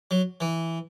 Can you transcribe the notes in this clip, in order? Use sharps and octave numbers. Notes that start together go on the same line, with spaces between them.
F#3
E3